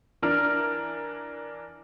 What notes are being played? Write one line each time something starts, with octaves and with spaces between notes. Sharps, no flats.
E3 D4 A#4 F6